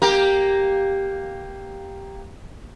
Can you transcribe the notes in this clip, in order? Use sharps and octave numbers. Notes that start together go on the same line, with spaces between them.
A#3 G4 A#4